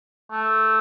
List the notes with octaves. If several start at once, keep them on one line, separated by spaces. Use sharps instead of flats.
A3